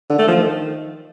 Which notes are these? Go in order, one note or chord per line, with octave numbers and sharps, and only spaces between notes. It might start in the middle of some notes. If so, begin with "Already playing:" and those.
D3
A3
F3
D#3